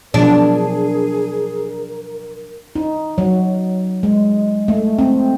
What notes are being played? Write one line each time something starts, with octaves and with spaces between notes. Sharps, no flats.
B2 F3 F#3 D4 G#4 A#4
D#4
F#3
G#3
A3
C4